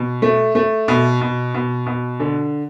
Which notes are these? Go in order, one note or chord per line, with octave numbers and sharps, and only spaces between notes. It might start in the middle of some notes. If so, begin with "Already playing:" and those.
Already playing: B2
A3
A3
B2
B2
B2
B2
D3